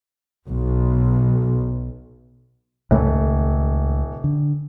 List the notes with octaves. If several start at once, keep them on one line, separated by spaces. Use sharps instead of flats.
B1
D#1 C#2 A3
D3